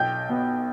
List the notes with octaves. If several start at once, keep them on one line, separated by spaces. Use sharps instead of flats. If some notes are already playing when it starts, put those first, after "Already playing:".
Already playing: B1 G5 G6
B2 B3